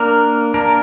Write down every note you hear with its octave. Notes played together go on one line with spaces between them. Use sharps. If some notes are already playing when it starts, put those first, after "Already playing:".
Already playing: A#3 D4 A#4
A#3 D4 A#4